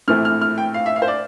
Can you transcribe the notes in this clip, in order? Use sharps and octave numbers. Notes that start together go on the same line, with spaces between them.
A#1 A2 E3 A3 C4 F6
F6
F6
G5
F5
E5
F5
C5
D5